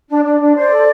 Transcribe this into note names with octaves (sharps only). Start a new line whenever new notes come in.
D4
D4
D4
C5 D5
A4